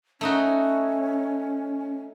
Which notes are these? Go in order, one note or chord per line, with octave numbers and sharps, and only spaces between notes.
A3 C#4 D#4 F#4